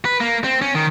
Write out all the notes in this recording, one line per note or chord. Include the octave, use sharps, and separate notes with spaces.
B4
A#3
C4
C#4
D#3